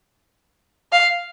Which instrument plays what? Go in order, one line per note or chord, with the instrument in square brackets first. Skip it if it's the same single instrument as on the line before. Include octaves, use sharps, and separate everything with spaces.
[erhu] F5